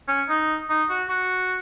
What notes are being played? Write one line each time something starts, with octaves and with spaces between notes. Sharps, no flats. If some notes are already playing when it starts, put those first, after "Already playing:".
C#4
D#4
D#4
F#4
F#4